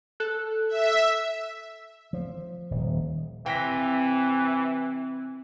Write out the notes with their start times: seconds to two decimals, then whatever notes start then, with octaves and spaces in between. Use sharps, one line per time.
0.20 A4 F#6
0.69 E5
2.13 F3
2.71 D#1
3.46 C3 E3 G5 A#6 B6